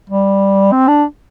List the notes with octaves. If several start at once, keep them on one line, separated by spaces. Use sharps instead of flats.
G3
C4
D4